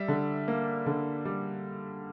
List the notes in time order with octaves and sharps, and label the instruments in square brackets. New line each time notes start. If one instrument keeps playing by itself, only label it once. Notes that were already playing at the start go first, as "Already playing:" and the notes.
Already playing: [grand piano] G3 E5
D3
A#3
D3
G3